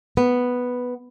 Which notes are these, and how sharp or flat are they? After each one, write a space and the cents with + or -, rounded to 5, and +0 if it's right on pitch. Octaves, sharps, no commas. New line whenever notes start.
B3 +0